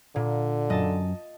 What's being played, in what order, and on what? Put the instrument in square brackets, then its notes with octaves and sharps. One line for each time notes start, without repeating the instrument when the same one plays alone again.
[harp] A#2 [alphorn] D3
[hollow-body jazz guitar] F#2 [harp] D#5 A5